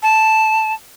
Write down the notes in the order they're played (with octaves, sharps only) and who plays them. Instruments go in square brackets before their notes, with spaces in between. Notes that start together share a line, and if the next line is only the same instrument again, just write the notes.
[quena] A5